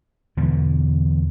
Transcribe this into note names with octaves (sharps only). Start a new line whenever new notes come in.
E2 B2 D3 E3